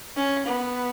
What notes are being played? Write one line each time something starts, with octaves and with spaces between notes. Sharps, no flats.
C#4
B3